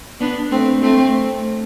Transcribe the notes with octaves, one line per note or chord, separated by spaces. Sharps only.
B3 D4
A3 C4
A3 C4